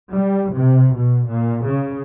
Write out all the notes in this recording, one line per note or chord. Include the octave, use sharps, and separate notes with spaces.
G3
C3
B2
A#2
C#3